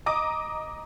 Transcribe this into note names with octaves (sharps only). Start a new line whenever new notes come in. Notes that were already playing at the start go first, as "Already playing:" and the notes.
D#5 A#5 D6 D#6